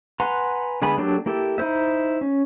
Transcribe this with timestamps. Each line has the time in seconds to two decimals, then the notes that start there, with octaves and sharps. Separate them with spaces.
0.20 B4 F#5 G#5 A#5 C6
0.82 D3 G#3 B3 G#5 B5
0.98 F#3 A#3 D4 G4 A4
1.26 A#3 E4 G4 A4
1.58 D#4 E4 C5 E5
2.21 C#4